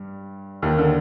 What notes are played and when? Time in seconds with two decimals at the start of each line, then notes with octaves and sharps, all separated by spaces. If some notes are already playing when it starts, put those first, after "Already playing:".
Already playing: G2 G3
0.62 D#2 D#3
0.73 D#3
0.78 D3